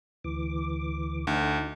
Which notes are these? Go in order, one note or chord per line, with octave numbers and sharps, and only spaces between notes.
D2 E3 D6
D2 D#4